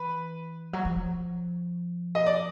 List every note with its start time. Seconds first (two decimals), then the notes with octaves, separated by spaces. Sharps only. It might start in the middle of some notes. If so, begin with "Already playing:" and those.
Already playing: E3 B4
0.73 F#3
0.85 F3
2.15 D#5
2.26 D5